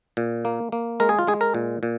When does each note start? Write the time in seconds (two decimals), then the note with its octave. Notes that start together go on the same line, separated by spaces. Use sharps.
0.17 A#2
0.45 A#3
0.72 A#3
1.00 G#3 A#4
1.09 G#4
1.19 F4
1.27 G#3 G#4
1.41 A#4
1.54 A#2
1.83 A#2